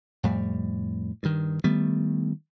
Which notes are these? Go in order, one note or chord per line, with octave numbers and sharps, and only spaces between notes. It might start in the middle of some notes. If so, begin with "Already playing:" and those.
F2 A2 G3
G2 D#3
D#3 G3 A3 B3